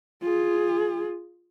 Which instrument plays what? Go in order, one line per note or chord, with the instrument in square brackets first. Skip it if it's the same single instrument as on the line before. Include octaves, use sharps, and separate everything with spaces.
[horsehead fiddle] F4 G#4